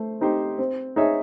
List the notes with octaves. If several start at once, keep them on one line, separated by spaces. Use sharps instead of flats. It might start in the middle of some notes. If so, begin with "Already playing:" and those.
Already playing: A3 C5
C4 D#4 G4 C5
C4
D#4 G#4 C#5 E5